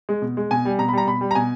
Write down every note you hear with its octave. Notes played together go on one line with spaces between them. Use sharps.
G#3
B2
G#3
B2 G#5
G3
B2 A#5
B5
G3 A#5
B2 B5
G3
A#5
B2 G#5